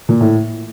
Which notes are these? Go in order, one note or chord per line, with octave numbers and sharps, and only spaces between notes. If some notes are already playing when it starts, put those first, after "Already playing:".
A#2
A2